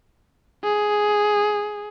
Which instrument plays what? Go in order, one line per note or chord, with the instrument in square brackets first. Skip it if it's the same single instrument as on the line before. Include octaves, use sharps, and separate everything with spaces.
[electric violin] G#4